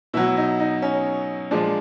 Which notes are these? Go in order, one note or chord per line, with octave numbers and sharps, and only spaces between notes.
B2 F#3 E4
D#4
D#4
C#4
A#2 F3 G#3 D4